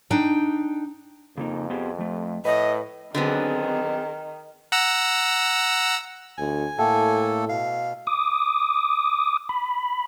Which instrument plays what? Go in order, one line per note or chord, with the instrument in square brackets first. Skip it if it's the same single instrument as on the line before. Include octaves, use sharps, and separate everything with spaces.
[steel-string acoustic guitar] D4 D#4 G5
[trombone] F2 [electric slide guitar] C#3 A#3 D#4
[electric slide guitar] B3 G4 G#4
F3 A3
[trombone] A2 [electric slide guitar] B4 [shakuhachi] D#5
[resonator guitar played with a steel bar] D3 F#3 B3 [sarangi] D#3 [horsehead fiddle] C4 G#4
[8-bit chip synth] F#5 A#5 E6
[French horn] D2 [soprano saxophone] G#5
[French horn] A2 [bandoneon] A3 A#3 A4 [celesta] E5 G5 A5
[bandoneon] B2 [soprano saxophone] F5
[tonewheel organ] D6 D#6
B5